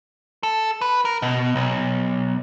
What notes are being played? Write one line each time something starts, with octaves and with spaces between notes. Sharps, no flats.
A4
B4
A#4
B2
B1